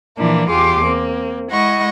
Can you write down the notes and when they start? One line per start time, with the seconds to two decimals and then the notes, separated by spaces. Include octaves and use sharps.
0.19 A#2 E3 F3 A#3 D4 E4
0.50 E2 F4 G4 G#4 C6 D6
0.83 A#3 C4
1.50 G#3 E4 D#5 F#5 C#6 A#6